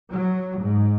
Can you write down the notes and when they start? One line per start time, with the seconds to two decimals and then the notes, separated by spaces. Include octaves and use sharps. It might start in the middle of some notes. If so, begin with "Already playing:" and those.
0.11 F#3
0.61 G#2